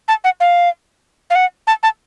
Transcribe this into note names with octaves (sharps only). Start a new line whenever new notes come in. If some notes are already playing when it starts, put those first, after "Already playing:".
A5
F#5
F5
F5
F#5
A5
A5